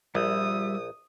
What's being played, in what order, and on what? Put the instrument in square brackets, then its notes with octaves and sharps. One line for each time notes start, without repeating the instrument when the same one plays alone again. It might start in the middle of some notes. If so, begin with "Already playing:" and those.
[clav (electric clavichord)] A#1 [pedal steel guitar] G3 E5 [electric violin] D#6